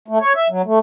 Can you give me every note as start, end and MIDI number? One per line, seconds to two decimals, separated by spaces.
0.08 0.18 57
0.21 0.33 73
0.35 0.48 76
0.50 0.62 54
0.66 0.79 57